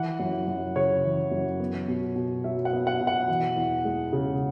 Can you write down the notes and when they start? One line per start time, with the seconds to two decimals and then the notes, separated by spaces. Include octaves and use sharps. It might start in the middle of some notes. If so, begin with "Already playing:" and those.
Already playing: E3 F#5
0.20 F#2
0.48 F#2
0.75 C#3 C#5
1.04 E3
1.32 F#2
1.60 B3
1.88 B2
2.16 B2
2.44 F#3 E5
2.65 F#5
2.73 B3
2.87 F#5
3.01 B2
3.07 F#5
3.28 E3
3.56 E2
3.85 G#3
4.13 C#3